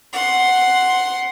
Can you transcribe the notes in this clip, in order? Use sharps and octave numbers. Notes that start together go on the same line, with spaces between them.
F#5 C6